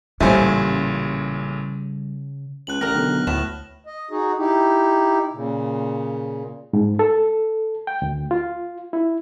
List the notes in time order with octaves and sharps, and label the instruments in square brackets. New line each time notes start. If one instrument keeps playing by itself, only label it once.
[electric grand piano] A1 A#2 G#5 [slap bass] C#3 C#4 [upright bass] G3 [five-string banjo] A3 C5
[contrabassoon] C#2 [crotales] F#6 F#7
[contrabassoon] A1 [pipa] G4 A#4 [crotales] F6 A#6
[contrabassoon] B1 [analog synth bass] D3
[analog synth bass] D2 [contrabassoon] A2 [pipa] B3 [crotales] E7
[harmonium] D#5
D#4 F#4 G#4
D#4 E4 G4
A#2 C#3
[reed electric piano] G#2
A4
G5
D2
F4
E4